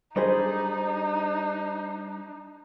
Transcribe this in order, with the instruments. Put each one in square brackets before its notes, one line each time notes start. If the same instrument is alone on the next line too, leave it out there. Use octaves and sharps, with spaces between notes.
[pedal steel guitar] G3 D4 B5 [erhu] D#4 [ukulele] G#4 C5 D#5